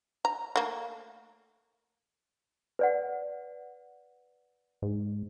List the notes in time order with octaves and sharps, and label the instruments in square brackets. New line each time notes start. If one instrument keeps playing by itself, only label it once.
[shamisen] A#5
A3 A#3
[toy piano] B4 D5 F#5
[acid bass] G#2